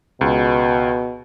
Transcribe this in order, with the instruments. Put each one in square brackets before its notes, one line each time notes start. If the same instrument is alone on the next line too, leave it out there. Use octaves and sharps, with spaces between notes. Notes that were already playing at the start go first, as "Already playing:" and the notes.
[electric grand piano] C#2 [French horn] B2